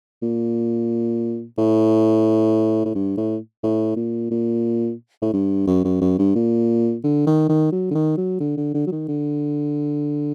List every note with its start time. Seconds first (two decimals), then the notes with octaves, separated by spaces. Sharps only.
0.22 A#2
1.58 A2
2.85 A2
2.95 G2
3.17 A2
3.63 A2
3.97 A#2
4.31 A#2
5.22 A2
5.33 G2
5.67 F#2
5.85 F#2
6.01 F#2
6.19 G2
6.36 A#2
7.04 D3
7.27 D#3
7.49 D#3
7.72 F#3
7.91 D3
7.95 D#3
8.17 F#3
8.40 D3
8.57 D3
8.74 D3
8.87 F#3
8.92 D#3
9.08 D3